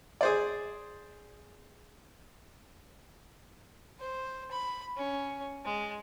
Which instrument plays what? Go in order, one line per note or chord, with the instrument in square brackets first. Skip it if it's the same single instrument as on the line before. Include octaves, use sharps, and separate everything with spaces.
[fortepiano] G#4 C5 D5
[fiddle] C5
B5
C#4
G#3